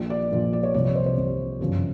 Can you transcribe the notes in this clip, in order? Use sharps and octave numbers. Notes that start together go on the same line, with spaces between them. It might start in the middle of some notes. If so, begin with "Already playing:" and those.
Already playing: A#1 A#2 F3
D5
A#1 A#2 F3
D5
C#5
C2 C3 F3 D5
C#5
C5
C5
C2 C3 F3
G1 F#2 C#3 F3